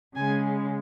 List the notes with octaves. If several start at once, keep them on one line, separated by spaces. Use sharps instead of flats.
C#3 G#3 G#5